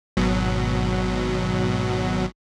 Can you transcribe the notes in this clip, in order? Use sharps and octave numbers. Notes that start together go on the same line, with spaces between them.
G#1 B2 F#3